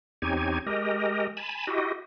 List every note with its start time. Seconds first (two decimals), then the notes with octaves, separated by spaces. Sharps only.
0.22 E2 C4 D#4 G4 C#5 G#5
0.66 G#3 G4 A#4 D#5
1.37 G#5 A5 B5
1.67 E4 F#4 G4 D#5